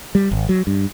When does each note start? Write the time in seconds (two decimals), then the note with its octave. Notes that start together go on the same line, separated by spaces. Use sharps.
0.15 G3
0.31 G#1
0.49 F#3
0.67 G2